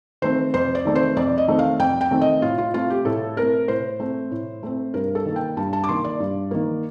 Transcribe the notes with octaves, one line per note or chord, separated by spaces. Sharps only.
D#3 A3 C4 C5
F2 C5
D5
D#3 A3 C4
C5
F2 D5
D#5
D#3 A3 C4
F5
F2 G5
G5
D#3 A3 C4
D#5
A2 F4
F4
A3 C4 F4
G4
A2 A4
A3 C4 A#4
A2 C5
A3 C4
A2
A3 C4
G2 A#4
A4
D#3 A#3
G5
G2 A5
A5
D6
D#3 A#3 C6
D5
G2
D#3 A#3